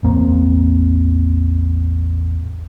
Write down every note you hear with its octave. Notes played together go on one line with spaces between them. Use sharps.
A1 E2 A#3 C4